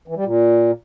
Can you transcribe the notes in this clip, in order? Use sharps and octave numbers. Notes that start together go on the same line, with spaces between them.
E3
G3
A#2